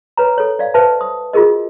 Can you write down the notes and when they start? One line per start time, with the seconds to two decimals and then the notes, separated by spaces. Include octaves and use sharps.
0.17 B4 C#5 A#5
0.38 A4 C#5
0.59 D5 F5
0.74 B4 C5 E5 A5
1.01 D#6
1.33 F4 F#4 G#4 A#4 D#5